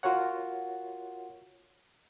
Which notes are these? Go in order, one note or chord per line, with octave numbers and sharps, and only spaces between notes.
F4 F#4 A#4 C#5 F#5